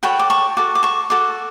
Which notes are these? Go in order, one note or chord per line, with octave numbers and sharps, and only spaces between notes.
F#4 A4 C#5 G5 B5
D6
A5 C#6
F#4 A4 D6
D6
A5 C#6
F#4 A4 D6